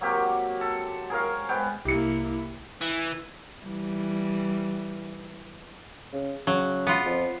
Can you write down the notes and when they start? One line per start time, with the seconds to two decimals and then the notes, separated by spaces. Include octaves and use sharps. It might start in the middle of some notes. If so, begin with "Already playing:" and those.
0.01 F#3 A#3 C4 G4
0.61 A4
1.10 G#4 A#4 C#5 F5
1.49 G#2 B3 G5
1.85 C2 A#3 E4 G4 C#7
2.81 E3
3.64 E3 G3
6.13 C#3
6.47 C#3 F#3
6.87 B3 F4
7.06 F2